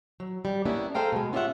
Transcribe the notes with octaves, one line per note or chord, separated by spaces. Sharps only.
F#3
G3
G3 A#3 B3 C#4 D4 E4
G#4 A4 C5 F5 G5 A#5
B2 G#3
C#4 F4 G4 D5 E5 F#5